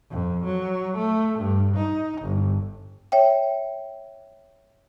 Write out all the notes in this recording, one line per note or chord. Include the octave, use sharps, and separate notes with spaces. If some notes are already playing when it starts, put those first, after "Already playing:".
F2
F#3
A3
G2
D#4
G1
C#5 E5 G5